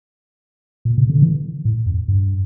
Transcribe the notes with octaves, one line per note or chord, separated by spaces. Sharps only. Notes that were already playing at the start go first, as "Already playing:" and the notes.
A#2
C3
D3
E3
A2
F2
G2